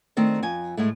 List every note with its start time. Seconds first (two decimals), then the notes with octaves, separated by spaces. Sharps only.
0.17 D#3 A3 C4 D4
0.43 F2 G#5
0.77 A2 G#3 A3